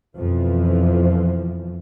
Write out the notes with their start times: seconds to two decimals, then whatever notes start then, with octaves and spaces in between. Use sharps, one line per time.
0.16 F2 B2 E3 F3